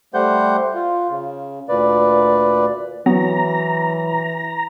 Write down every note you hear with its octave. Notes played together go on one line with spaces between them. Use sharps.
G3 A3 G4 C5 F#5 G6
F4
C#3
D2 A#2 B4 D5
E3 F#3 B3 A#5